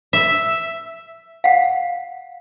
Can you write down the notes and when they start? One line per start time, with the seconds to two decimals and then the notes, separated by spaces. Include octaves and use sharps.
0.13 E5
1.44 F5 F#5